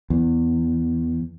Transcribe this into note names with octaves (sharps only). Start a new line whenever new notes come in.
E2